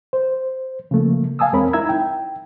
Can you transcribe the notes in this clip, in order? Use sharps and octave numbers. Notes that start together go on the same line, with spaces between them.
C5
C#3 F3 A3 A#3
F5 G#5 A5 D#6 E6
E2 G#3 C4 A#4 C#5 B5
D#4 E4 E5 A#5 E6 G#6
G5